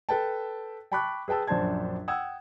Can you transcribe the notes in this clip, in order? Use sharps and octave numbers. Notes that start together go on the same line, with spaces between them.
A4 B4 G5 A5
G5 A5 B5 C#6 D6 F#6
G#4 B4 G5 A5 E6
A#1 F#2 D4 C5 A5 G#6
F#5 G5 D#6 E6 G#6